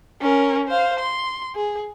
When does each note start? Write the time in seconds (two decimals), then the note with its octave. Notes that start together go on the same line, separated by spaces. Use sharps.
0.21 C#4 A#4
0.68 C5 F5
1.00 C6
1.55 G#4